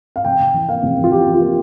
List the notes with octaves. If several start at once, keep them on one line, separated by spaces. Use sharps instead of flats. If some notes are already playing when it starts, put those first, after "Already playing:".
F5
F1 G5
F1
E3
A#3 F5
F1
E3
F4
E3 G4
E3
F4
A#3